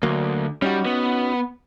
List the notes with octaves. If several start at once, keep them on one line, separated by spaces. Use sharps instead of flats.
D2 F#3 A#3
G3 C#4 D#4 F#4
B3